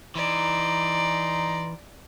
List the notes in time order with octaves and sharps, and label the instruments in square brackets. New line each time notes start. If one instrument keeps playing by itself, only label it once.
[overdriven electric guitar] E3 [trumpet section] D#4 A#5 C6 [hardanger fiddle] D5